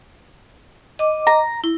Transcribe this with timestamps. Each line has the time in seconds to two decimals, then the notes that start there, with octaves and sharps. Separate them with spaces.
0.99 D#5 D6
1.27 A#5
1.64 E4